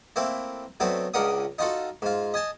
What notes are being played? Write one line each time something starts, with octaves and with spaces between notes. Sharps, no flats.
A3 A#3 C4 E4
F#3 A3 B3 C4 D4
C#2 C#3 D4 A#4 F#5 D#6
D#4 F4 F#4 A4
G#2 F4
D#5 G#5 A5